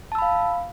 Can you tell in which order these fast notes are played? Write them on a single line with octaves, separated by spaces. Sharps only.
A5 E6 B5 F5